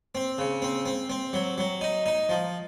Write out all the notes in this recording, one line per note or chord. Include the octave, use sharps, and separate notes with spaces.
C4
C#3
C4
C4
C4
F#3
F#3
D#4
D#4
F3